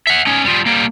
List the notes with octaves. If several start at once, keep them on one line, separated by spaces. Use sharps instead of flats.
E5 F#5
C#4 D#4
G3 F4
G3 A#3